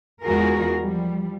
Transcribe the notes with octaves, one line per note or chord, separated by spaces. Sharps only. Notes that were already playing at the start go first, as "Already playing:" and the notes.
E2 G#3 F4 F#4 G#4 A#4
F3 G3